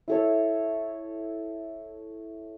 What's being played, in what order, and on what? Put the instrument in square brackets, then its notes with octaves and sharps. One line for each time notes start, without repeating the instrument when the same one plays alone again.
[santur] E4 A4 C#5